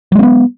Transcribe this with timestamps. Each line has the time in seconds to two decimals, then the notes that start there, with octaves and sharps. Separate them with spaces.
0.12 F#3
0.15 G#3
0.19 C4
0.23 B3